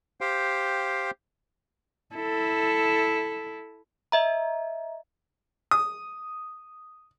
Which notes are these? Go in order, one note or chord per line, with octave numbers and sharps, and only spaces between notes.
G4 C5 F5 G5
E4 A4
D#5 E5 A#5
D#6